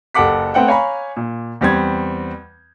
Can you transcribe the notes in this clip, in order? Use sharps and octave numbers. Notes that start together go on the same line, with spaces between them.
F#1 G4 A4 F#5 D6 B6
A3 B3 C4 F#5 G5
C#5 F5 G#5 A#5 B5 C#6
A#2
E2 G3 C4 G#6